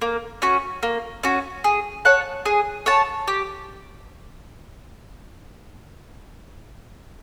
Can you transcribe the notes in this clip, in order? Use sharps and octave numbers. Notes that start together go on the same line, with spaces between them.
A#3
C#4 F#4
A#3
C#4 F#4
G#4
C#5 F#5 A5
G#4
C#5 F#5 A5
G4